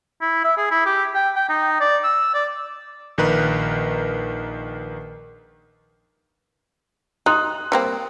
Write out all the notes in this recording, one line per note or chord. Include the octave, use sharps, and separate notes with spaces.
E4
E5
G#4
E4
G4
G5
G5
D#4
D5
E6
D5
A#1 D#3 A#4 B4 F#6
D#4 C6 D#6 F#6
G3 A#3 C4